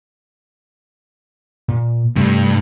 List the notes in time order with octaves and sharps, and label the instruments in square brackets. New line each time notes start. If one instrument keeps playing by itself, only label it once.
[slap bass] A#2
[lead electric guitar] G2 [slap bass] C3 A3